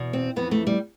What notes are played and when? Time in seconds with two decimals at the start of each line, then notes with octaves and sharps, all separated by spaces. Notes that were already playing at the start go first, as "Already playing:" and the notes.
Already playing: E2 B2
0.13 C4
0.36 F2 E3 B3
0.51 A3
0.67 G3